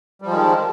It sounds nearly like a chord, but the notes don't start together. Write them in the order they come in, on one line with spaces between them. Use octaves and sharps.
G3 F3 G#3 D#3